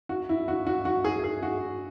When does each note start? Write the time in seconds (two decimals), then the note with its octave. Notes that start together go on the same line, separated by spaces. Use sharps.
0.09 F#4
0.29 E4
0.48 F#4
0.67 F#4
0.85 F#4
1.04 G#4
1.24 G#4
1.43 F#4